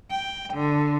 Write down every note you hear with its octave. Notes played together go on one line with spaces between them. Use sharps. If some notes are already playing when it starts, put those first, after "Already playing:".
G5
D3